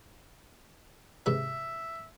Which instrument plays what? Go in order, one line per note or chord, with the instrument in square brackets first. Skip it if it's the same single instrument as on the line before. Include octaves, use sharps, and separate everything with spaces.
[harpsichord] G#2 C3 B4 [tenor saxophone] E5